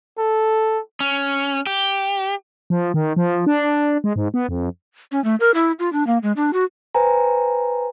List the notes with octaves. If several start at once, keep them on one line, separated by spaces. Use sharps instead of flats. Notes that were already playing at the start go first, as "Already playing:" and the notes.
A4
C#4
G4
F3
D#3
F3
D4
G#3
G#2
B3
F2
C#4
A3
A#4
E4
F4
D4
A#3
G#3
D4
F#4
B4 C5 G5 G#5 A#5